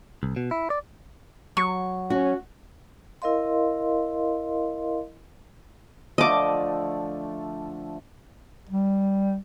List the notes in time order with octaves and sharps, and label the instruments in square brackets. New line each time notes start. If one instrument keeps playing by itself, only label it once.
[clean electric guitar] C2
B2
E4
D5
[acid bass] F#3 [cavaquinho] C#6
[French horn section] C#4 [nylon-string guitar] F#4
[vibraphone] E4 A#4 D#5 F5 C6
[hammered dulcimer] D3 F3 A3 [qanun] D#5 D6
[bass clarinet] G3